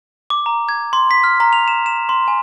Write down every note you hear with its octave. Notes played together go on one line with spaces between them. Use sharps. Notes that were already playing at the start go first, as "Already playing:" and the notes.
D6
A#5
G#6
C6
B6
F6
A#5
F7
E7
E7
C6
G#5